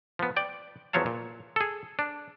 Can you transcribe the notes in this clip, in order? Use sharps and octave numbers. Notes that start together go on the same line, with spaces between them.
F3 B3
D5 G5
E2 F3 F#3 C#5 F5 A5
A#2
G#4 A4
D4